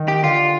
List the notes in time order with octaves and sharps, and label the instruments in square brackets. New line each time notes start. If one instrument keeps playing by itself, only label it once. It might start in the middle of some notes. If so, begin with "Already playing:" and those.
Already playing: [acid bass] D#3
[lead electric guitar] G4
[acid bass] D3 [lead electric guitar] F4